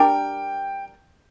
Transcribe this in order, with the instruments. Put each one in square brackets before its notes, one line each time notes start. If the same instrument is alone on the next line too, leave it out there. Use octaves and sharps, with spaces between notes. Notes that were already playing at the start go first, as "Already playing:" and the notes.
Already playing: [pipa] G3 D4 G4 A#4 [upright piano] G5